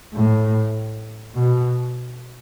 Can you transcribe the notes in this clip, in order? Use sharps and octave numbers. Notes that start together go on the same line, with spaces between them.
A2
B2